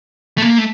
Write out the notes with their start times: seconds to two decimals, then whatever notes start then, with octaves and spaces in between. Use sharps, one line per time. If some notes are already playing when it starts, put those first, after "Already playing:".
0.38 A3
0.42 A#3
0.58 A3